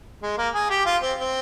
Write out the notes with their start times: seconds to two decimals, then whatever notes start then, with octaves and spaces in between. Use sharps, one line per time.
0.22 G#3
0.38 A#3
0.54 G#4
0.70 G4
0.86 F4
1.02 C4
1.18 C4